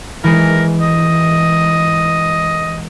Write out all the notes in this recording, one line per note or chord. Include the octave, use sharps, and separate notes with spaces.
E3 G#3 A#4
D#5